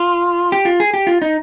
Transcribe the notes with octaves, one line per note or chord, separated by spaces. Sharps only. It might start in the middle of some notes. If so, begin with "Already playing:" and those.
Already playing: F4
G4
F4
G#4
G4
F4
D#4